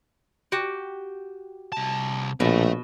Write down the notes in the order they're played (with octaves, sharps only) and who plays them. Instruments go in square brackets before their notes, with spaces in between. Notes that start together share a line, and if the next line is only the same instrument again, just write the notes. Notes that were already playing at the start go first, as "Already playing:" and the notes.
[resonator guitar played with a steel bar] F#4 G4
[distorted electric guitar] C2 A5
[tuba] A#1 [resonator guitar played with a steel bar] B2 [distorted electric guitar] A3 E5